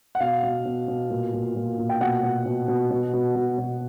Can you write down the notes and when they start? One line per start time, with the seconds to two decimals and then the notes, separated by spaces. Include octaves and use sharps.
0.15 F#5
0.20 B2 F5
0.43 B2
0.65 B2
0.88 B2
1.10 A#2
1.33 A#2
1.56 A#2
1.78 A#2
1.89 G5
2.01 B2 F#5
2.23 B2
2.46 B2
2.68 B2
2.91 B2
3.13 B2
3.35 B2
3.58 B2